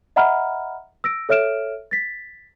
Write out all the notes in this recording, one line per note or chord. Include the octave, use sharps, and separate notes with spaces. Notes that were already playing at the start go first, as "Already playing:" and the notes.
D#5 E5 F#5 A#5 B5 F6
E6 A#6 D7
A4 C#5 E5 F6 D7 E7
A6 B6